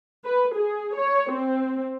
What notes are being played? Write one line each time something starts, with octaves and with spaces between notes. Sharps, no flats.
B4
G#4
C#5
C4